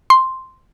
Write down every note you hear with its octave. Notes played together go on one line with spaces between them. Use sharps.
C6